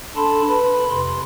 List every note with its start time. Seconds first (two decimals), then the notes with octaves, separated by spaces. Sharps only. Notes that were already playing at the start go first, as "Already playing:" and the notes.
0.16 D4 A4 A5 B5 C6
0.49 B4 B5
0.89 F2 C3 C6